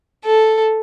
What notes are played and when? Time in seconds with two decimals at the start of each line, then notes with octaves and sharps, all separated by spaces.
0.25 A4